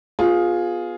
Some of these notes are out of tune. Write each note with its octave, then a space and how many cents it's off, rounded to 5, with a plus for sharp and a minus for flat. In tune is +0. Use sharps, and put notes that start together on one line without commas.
B3 +0 F4 +15 G#4 +0